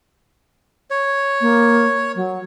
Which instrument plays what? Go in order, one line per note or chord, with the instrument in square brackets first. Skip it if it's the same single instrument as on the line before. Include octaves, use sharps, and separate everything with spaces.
[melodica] C#5
[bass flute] A#3
F#3